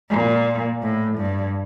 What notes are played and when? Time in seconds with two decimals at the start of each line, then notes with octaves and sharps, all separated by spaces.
0.10 A#2
0.82 A2
1.18 G2